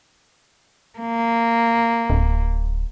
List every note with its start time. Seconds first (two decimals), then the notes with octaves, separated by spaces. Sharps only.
1.00 A#3
2.10 D1